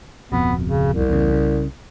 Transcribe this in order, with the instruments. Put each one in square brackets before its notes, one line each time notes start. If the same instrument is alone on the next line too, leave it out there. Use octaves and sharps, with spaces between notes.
[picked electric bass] D1 F2 B2 [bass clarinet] B3
[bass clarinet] C#3
C2
[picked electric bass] E2 C#3
C#3